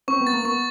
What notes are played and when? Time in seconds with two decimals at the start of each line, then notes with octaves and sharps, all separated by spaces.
0.08 C4 C#6
0.20 B3
0.27 A6
0.33 A#3
0.45 B3 C#6